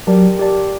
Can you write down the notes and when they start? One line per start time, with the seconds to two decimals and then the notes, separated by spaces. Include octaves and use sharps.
0.07 F#3 G4 A#4 D5 A5
0.39 G4 A#4 D5 A5